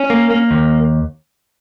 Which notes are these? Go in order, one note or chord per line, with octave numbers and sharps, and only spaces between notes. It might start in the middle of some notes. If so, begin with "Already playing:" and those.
Already playing: C#4
A#3
A#3
D#2